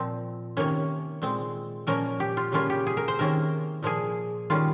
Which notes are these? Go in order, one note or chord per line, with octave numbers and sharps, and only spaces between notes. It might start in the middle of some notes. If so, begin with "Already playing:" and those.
Already playing: A#2 F3 C4
C3 D#3 A#3 C#4 C#5
A#2 G#3 C4
A#2 F3 A#3 C#4 A#4
G4
F4
C#3 G3 A#3 C#4 F4
G4
G#4
A#4
C5
C3 D#3 A#3 C#4 A#4
A#2 F3 A#3 G#4
D#3 G3 C#4 F4